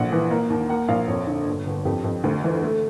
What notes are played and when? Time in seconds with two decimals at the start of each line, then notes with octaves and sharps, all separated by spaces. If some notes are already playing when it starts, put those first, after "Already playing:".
Already playing: A#1 D3 F#5
0.12 E3
0.31 A#3
0.50 D#2
0.70 A#3 F#5
0.88 A#1 F5
1.08 F2 C#5
1.27 D3
1.47 G1
1.66 G1
1.85 F2 G4
2.04 F2
2.24 D2
2.44 E3
2.62 A3